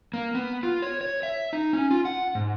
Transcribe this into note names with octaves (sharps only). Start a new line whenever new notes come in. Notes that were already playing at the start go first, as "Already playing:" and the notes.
A#3
B3
F4
C#5
C#5
E5
D#4
C#4
F4
F#5
G#2